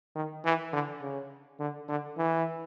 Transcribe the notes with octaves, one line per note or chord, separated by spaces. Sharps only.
D#3
E3
D3
C#3
D3
D3
E3